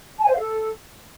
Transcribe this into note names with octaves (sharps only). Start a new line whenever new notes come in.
A5
G#5
C5
F5
A4